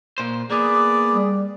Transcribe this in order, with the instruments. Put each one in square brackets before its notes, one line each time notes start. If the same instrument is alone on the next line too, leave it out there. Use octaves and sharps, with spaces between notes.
[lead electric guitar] A#2 C5
[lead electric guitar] A#3 B3 [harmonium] G#4 [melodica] D5
[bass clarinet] G3